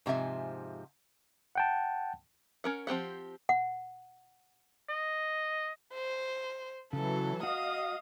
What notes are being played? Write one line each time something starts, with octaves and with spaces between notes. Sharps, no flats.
G#2 C3 F3 E5 G#5
F#5 G5 A5
C#4 A#4 F#5
F3 C4 G4 F#5
F#5
D#5
C5
C#3 E3 F#3 A4
F#4 D#5 F5 D#6